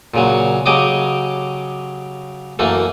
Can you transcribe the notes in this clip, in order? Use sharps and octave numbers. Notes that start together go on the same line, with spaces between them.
A#2 C#3 F#3
C#3 F#3 G4 D#5 D6
F#2 E3 A3 A#3